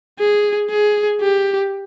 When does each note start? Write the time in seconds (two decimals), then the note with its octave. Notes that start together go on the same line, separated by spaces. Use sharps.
0.19 G#4
0.70 G#4
1.21 G4